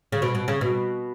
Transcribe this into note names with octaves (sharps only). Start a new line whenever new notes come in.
C#3
B2
B2
C#3
B2